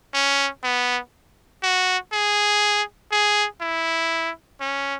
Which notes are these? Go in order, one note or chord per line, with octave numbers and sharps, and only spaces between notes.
C#4
B3
F#4
G#4
G#4
E4
C#4